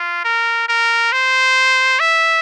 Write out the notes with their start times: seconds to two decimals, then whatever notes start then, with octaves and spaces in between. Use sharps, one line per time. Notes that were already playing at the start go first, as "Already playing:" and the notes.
Already playing: F4
0.25 A#4
0.68 A#4
1.12 C5
2.00 E5